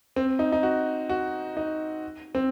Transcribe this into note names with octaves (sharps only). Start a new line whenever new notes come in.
C4
D#4
D#4
F#4
F#4
D#4
C4